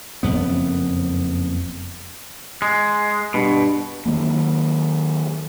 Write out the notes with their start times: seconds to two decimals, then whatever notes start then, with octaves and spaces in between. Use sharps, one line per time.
0.23 F#1 F2 B3
2.62 G#3
3.34 G2 B2
4.06 D#3 F3 F#3 A#3